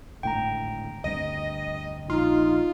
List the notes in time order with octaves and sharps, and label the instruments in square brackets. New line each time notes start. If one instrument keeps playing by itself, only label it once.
[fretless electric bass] G#1 A2 D3 [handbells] G5 A#5
[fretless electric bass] D2 G2 C4 [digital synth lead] D#5
[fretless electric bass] A#1 [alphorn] D#4 [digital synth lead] F4